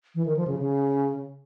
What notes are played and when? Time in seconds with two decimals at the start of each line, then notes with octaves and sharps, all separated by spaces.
0.15 E3
0.26 D#3
0.37 F3
0.47 C#3
0.58 C#3